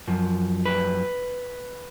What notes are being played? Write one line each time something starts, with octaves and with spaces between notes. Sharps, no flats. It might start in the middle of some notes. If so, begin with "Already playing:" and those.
F#2 F3
B4